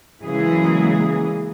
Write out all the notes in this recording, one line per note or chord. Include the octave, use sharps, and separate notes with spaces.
C#3 E3 F#3 G#3 A#3 G#4